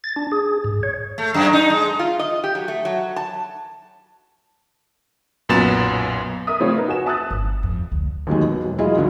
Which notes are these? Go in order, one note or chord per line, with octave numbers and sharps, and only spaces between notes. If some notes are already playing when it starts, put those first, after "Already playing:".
A6
D4
G#4
G#2
C#5
A3
F#2
D#4
G#3
F4
D#5
G4
F#3
A3
F#3
A5
B1 F#2 A#2 B3 A6 E7
A#4 E5 D#6
C#3 F3 A3 C4 F4 C#5
B3 D#4 A#4 B4
F#4 G#5 E7
E5 A5 D#6 E6 F#6 A6
G1
F2
D2
D#2 D#3 F#3 G#3
B2
E1
F#3 G#3 E4 F4 G#4 D#5
C#2 F#2 D3 D#3 F3 F#3